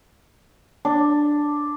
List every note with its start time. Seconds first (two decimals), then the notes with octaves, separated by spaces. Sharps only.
0.85 D4